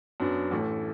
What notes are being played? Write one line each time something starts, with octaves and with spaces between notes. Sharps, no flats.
F#2 F#3 B3 D4
A1 A2 E3 A3